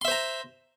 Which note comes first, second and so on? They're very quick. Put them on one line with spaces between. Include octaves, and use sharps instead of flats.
C6 E5 C5 A#5